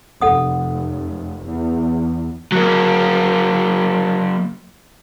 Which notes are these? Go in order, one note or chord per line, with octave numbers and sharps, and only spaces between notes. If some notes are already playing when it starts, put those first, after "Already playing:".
F1 A4 F#5 D#6
E2
F#3 A#3